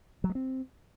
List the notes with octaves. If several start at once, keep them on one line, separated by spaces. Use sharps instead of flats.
F#3
G#3
C4